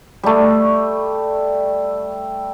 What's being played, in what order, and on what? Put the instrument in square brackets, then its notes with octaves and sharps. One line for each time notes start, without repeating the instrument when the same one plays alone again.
[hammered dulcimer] G3 A3